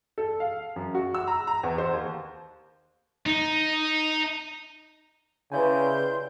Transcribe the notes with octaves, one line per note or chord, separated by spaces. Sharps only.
A4
F5
F#2
F#4
E6
A#5
A#5
E2
C5
D#2
D#4
C#3 E4 G4 B4 D5 G#5 C6 G6